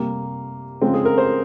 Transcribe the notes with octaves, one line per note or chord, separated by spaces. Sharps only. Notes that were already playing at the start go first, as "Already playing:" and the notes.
Already playing: C3 G3 A#3
C#3 F3 G#3 C4
G#4
A#4
C5